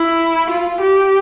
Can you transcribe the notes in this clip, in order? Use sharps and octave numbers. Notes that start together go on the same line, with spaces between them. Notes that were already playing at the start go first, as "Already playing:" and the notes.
Already playing: E4
F4
G4